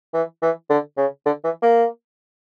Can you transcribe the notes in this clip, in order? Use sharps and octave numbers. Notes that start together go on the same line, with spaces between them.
E3
E3
D3
C#3
D3
E3
A#3